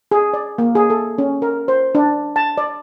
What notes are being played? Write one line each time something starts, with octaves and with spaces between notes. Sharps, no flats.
G#4
D5
A#3
G#4
A4
C#4
A#4
C5
D4
A5
D5